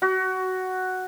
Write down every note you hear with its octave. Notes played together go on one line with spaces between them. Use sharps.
F#4